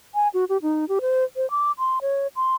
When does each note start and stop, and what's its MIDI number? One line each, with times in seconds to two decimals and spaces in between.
0.15 0.28 80
0.34 0.45 66
0.49 0.57 67
0.62 0.85 63
0.89 0.99 67
1.01 1.24 72
1.36 1.49 72
1.51 1.72 86
1.79 1.99 84
2.02 2.27 73
2.36 2.56 84